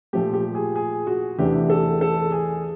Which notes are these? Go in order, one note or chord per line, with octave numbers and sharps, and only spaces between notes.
A#2 F3 A3 G4
G4
G#4
G#4
F#4
E2 C3 E3 A3 D4 G4
A4
A4
G#4